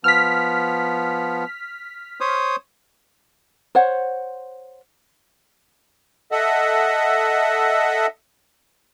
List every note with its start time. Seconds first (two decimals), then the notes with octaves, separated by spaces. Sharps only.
0.04 F3 B3 F6 B6
2.20 C5 C#5 D#6
3.75 C5 C#5 F#5
6.32 A4 D#5 E5 F#5